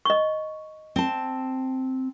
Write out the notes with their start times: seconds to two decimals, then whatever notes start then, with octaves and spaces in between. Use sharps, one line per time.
0.05 D#5 C#6
0.96 C4 A5